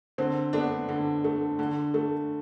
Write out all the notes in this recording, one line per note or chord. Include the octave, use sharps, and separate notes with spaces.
D3 C4
A3 B3 D4
D3
A3
D3
A3